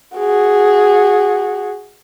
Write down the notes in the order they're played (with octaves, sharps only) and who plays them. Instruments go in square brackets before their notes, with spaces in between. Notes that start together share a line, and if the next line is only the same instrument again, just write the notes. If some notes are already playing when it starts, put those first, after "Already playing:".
[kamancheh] F#4 G#4